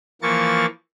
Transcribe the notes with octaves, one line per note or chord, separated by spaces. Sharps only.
E3 F3 A#3 C#6 A6